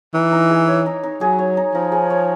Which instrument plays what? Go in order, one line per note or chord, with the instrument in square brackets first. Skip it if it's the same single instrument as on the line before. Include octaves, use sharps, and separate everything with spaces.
[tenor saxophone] E3 [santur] D#4
[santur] D#4
G#4
C#5
D#4
D#4
[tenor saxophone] F#3 [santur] G#4
[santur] C#5
D#4
[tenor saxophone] F3 [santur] D#4
[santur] G#4
C#5